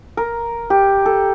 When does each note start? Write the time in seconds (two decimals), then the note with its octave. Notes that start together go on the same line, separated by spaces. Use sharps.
0.17 A#4
0.70 G4
1.06 A4